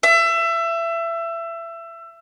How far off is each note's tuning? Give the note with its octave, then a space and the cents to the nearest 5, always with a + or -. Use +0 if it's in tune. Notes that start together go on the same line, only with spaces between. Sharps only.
E5 +25